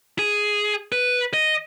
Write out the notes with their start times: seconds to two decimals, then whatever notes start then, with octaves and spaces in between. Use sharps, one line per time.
0.19 G#4
0.92 B4
1.34 D#5